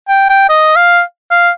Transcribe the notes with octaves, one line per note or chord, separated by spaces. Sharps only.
G5
G5
D#5
F5
F5